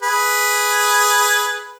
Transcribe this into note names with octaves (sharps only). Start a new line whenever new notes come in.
G#4 B4